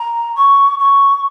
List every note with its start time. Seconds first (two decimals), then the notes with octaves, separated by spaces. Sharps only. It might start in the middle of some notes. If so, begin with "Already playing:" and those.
Already playing: A#5
0.35 C#6
0.79 C#6